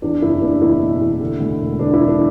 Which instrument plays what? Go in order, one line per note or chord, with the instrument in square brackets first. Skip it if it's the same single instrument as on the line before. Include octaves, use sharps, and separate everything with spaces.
[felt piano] E2 [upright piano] D4
[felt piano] F#1 [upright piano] E4
[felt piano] F#1 [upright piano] D4
[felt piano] E2 [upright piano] E4
[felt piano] B2
E2
D3
D2
E1
[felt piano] D3 [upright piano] D4
[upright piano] E4
[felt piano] E1
[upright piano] D4